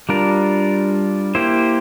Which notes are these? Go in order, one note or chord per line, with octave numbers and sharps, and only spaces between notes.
G3 D4 F4 A#4
A#3 E4 G4 C5